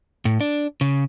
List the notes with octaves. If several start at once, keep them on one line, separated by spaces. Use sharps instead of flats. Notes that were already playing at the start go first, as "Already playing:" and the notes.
A2
D4
C#3